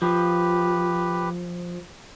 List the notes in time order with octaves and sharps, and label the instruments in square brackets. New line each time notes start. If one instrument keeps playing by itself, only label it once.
[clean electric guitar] F3 [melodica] G4 B4